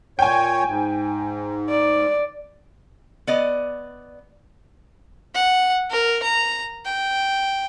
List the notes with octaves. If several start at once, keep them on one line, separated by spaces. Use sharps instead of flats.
A#2 C#5 G5 G#5
G#2
D5
B3 D5 D#5
F#5
A#4
A#5
G5